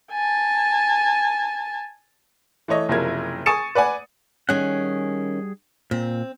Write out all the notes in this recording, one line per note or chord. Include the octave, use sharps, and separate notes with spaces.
G#5 A5
E3 A3 C#5 D#5
F#1 C3 F3 E4 A#4 G#6
G#5 C#6 D#6 A6 C#7 E7
B4 D5 F#5 G#5
D#3 G3 C#4 G#4 F#5
A#2 C4